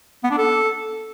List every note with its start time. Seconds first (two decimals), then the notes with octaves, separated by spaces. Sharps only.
0.24 B3
0.31 D4
0.38 A4